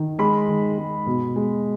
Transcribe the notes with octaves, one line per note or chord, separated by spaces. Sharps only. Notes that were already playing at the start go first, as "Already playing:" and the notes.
Already playing: D#3
G#3 B5
D#3
G#3
B2
G#3